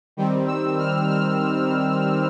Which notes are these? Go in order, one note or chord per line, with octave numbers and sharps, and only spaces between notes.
D#3 G3 C4
E6
F6
F6